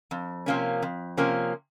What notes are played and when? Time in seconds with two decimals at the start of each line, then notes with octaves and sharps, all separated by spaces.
0.11 F2
0.46 C3 F3 A#3 C#4
0.82 F2
1.17 C3 F3 A#3 C#4